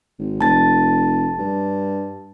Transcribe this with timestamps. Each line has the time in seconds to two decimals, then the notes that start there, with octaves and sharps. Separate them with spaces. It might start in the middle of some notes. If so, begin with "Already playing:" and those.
0.19 G#1
0.41 F1 A5 A6
1.39 G2